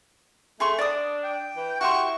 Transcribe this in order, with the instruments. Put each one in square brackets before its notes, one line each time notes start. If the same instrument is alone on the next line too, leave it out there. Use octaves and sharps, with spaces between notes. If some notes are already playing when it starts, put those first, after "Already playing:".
[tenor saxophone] A3 [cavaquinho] G#4 C6 C#6
[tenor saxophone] D4 [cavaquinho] D5 D#6
[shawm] G5
[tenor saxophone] E3
[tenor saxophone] E4 [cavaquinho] F#4 G4 C6 [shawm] C#6